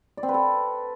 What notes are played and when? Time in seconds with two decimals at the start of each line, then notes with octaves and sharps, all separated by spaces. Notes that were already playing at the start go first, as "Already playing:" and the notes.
0.17 D5
0.23 C4
0.29 B4
0.34 A4